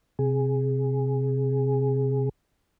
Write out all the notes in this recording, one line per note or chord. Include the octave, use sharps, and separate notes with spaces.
C3 G#4